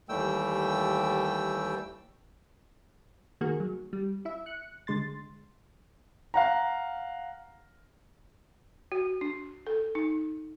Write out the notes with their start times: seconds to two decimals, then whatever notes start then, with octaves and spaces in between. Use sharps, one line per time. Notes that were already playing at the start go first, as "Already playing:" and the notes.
0.09 D#2 E3 G3 A3 G5 E6
3.41 D#3 A#3 F#4 G#4
3.60 F#3
3.93 G3
4.25 E4 E5
4.46 F#6 C#7
4.87 D3 G#3 C6 A6
6.34 F5 F#5 A#5
8.92 F#4
9.21 D4
9.67 A4
9.95 D#4